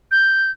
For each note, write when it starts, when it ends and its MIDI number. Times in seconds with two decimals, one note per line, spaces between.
0.11 0.51 91